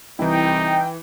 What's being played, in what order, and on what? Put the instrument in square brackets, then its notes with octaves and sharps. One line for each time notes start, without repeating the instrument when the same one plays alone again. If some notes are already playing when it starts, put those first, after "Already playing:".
[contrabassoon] C2 [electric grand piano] E3 E4 [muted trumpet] D#4 [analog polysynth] G5